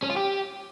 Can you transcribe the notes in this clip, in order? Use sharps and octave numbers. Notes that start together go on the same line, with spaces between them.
C#4
F4
G4